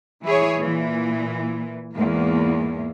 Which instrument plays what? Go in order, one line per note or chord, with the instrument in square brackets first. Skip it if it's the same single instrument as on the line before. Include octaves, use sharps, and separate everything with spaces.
[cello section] E3 E4 G#4 C#5
A#2 E3
E2 G#2 A#3